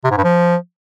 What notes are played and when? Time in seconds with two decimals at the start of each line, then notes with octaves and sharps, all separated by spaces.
0.04 C3
0.11 G#2
0.17 G2
0.24 F3